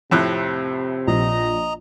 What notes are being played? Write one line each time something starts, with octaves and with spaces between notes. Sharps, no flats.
F2 A2 C3 F#6
A#1 D#5 A#5